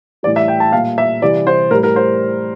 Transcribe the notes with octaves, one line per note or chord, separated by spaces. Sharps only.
A2 E3 G3 D5
E5
G5
A5
A#2 G3 F5
E5
C3 E3 G3 D5
C5
A2 G3 A#4
A#4
C5